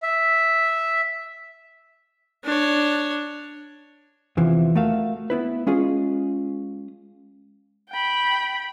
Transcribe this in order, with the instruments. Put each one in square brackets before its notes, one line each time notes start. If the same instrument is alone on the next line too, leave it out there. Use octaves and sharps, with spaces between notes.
[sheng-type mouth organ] E5
[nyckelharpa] D4 C#5
[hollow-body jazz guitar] E2 C3 E3 F3
A3 F#4 A#4 E5 F5
B3 E4 B4
G#3 C#4 F4 G#4 D#5
[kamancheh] G5 B5